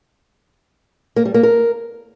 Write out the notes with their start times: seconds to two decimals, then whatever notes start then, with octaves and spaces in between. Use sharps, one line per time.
1.16 A#3
1.25 G3
1.34 A#3
1.43 A#4